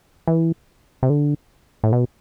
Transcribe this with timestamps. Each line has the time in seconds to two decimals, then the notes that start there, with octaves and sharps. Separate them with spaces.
0.28 E3
1.03 C3
1.10 D3
1.84 A2
1.92 B2